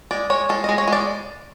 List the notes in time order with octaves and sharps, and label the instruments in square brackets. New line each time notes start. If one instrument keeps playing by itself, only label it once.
[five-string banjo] G#3 D5
G#3 C#5
G#3 A4
G#3 D#5
C#5
G#3 D5